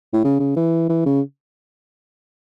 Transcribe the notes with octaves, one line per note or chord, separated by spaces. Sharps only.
A2
C#3
C#3
E3
E3
C#3